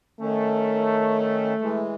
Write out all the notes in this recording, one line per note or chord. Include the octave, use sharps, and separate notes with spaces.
D#3 A3 C#4
E3 G#3